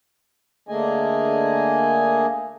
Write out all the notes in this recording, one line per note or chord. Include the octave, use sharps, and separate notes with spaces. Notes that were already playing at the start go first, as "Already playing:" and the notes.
D3 A3 A#3 G#4 D#5 G#5